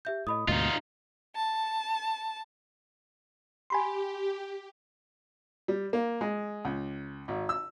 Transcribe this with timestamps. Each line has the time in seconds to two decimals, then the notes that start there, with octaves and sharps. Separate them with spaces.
0.05 G4 E5 G6
0.27 A2 D#5 B5 D#6
0.48 D2 G#2 B2 D#4 F4 D#5
1.35 A5
3.70 G4 G#5 B5 C6
5.68 G3
5.93 A#3
6.21 G#3
6.65 C#2
7.28 G#1
7.49 E6